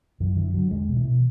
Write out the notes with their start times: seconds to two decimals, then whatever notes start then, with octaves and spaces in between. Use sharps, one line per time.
0.20 F#2 E3
0.37 D3 E3
0.54 D3 F#3
0.71 E2 G#3
0.89 B2
0.96 E3
1.04 B2